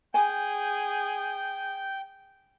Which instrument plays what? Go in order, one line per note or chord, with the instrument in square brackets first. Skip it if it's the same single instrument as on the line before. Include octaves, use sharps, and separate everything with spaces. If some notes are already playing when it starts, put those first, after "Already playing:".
[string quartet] G#4 [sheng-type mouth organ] G5 G6 [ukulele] G#5